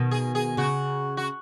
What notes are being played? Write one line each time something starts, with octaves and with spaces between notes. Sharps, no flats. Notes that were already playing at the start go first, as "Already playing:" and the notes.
Already playing: B2 D#3
G#4
G#4
C#3 F#4
F#4